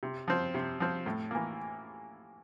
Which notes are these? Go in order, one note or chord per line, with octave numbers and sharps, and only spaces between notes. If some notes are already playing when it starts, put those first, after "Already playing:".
C3
F3 C4
C3
F3 C4
A2
E3 A#3